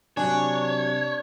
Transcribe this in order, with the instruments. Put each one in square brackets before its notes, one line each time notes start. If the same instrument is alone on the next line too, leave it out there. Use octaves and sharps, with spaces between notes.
[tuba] C3 [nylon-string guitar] F#3 G#5 [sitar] D4 [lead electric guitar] C#5